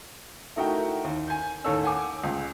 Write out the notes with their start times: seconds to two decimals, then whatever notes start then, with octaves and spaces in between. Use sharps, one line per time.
0.56 A3 D#4 E4 F#4 A#4 G5
1.04 D#2
1.28 G#5 G6
1.64 D#2 A2 A4 C#5 E6
1.84 F#5 G#5 D6
2.24 C#2